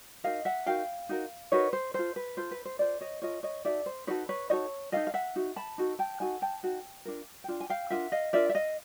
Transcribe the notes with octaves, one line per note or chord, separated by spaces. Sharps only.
D#4 F#4 A#4 D#5 F5
E5 F#5
D#4 F#4 A#4 F5 G5
D#4 F#4 A#4
D#4 F#4 A#4 B4 C#5
C5
F4 A4 C5
B4
F4 A4 C5
B4
C5
F4 A4 C5 D5
C#5 D#5
F4 A4 C#5 D#5
C#5 D#5
D#4 F#4 A4 D5 E5
C5
D#4 F#4 A4 B4 C#5
B4 C#5
D#4 F#4 A4 C#5 D#5
D#4 F#4 A4 D#5 F5
F5
E5 F#5
D#4 F#4
A5 B5
D#4 F#4 A4
G5 A5
D#4 F#4 A4 F#5 G#5
G5 A5
D#4 F#4 A4
D4 F4 A#4
G5
D4 F4
G#5
F5 G5
D4 F4 A#4 E5 F#5
D#5 F5
D4 F4 A#4 D5 E5
E5
D#5 F5